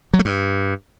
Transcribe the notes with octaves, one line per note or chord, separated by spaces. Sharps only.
F#3
A3
G2